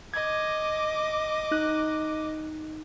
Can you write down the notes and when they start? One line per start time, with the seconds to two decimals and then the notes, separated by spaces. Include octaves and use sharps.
0.14 D#5 D6 G#6
1.51 D#4 F#6